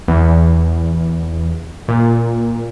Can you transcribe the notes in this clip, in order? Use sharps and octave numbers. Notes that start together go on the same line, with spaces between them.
E2
A#2